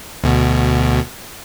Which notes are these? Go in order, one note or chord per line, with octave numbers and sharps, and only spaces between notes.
D2 B2